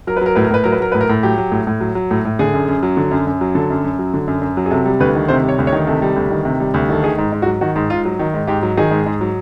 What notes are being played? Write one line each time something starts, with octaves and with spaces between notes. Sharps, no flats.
F#3 A#4
B4
F#3 A#4
A2 B4
A#4
A2 B4
F#3 A#4
B4
F#3 A#4
A2 B4
A#4
A2
F#3 G4
F#3
A2
A2
F#3
F#3
A2
A2
D3 G#4
F#2
F#2
F#3
D3
F#2
F#2
F#3
D3 A4
F#2
F#2
F#3
D3
F#2
F#2
F#3
G#4
C3 A4
G3
D2 B4
D#3
C3 C5
G3
C#5
D2
C#5
D#3
C3 A4
G3
D2
D#3
C3
G3
D2
D#3 A4
D#3 G#4
G#2
G#2
F#4
F#3
D#3 F#4
G#2
G#2 F4
F#3
D#3
G#2
G#2 G4
F#3
D#3 G#4
G#2
G#2
F#3